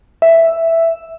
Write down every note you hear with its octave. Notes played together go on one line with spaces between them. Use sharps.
E5